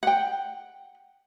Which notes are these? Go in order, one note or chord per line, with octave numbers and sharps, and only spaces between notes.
F#5 G5